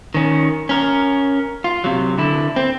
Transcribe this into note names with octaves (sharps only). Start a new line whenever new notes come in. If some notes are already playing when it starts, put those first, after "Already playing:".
D#3 C#4
C#4 A#4
F4
C3 F#3
D3 E4
C4